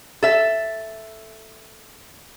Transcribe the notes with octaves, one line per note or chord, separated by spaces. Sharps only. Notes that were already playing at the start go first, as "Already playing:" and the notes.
A4 E5